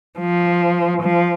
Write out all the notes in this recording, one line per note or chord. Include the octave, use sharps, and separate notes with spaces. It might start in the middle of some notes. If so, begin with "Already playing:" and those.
F3
F3